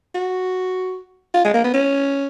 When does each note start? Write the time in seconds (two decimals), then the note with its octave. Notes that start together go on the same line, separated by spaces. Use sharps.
0.15 F#4
1.34 F4
1.44 G#3
1.54 A#3
1.64 B3
1.74 C#4